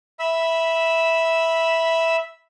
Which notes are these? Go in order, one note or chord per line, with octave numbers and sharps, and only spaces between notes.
E5 B5 E6